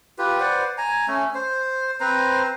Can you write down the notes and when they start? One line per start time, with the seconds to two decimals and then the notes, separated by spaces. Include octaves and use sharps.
0.18 F4 G4 B4
0.40 B4 C5 D5 F#5
0.78 G#5 A#5
1.08 A3 C#4
1.35 C5
2.00 C4 B4 C5 A#5